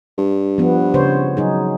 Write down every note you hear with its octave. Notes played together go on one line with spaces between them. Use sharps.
G2
F3 B3
C#3 C5 C#5
F#3 D#4 G#4